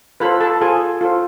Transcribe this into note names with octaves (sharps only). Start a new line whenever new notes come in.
F4 A4 B4 C5 B5
A4 A5
F4 G#4 A4 C5 G#5
F4 A4 C5